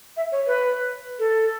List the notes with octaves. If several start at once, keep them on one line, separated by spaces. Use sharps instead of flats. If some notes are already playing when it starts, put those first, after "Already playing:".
E5
C#5
B4
A4